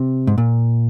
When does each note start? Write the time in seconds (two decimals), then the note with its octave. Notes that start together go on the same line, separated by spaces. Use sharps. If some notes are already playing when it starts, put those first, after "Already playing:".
Already playing: C3
0.27 G#2
0.38 A#2